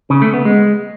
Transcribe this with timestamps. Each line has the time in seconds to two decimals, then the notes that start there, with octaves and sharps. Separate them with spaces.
0.10 C#3
0.22 A3
0.34 B3
0.45 G#3